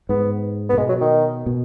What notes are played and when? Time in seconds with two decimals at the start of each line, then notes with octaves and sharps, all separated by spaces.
0.09 G#2 B3
0.69 B3
0.73 C#3
0.78 B2 G#3
0.89 F#3
1.01 D#3
1.46 B2